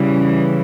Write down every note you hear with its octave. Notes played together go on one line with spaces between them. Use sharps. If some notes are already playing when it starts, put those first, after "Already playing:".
Already playing: C#3 E3 G3